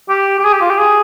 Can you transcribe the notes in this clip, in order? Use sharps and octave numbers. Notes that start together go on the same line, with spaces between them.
G4
G4
G#4
G4
F4
G4
G#4